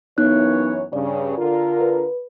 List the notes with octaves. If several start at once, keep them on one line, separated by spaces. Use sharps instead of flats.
F#2 E3 B3 D#4 C#5 F#6
G2 C#3 D5
D3 F4 A#4
B4